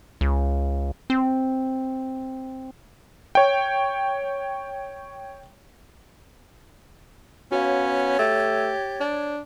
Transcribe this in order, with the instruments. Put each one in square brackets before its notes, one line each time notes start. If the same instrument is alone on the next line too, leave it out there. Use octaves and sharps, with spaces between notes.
[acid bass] C#2
C4
[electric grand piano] C#5 G5
[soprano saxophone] B3 [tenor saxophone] C#4 [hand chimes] F#4 F5 [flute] C#5
[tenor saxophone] A3 [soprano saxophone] G4 [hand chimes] A6
[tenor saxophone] D4